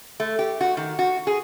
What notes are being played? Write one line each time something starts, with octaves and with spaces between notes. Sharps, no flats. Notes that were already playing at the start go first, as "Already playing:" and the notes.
A3
G4
F#4
D#3
F#4
G#4